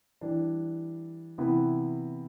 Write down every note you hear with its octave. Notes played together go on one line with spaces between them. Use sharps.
E3 G3 D4
C3 E3 B3 E4 B4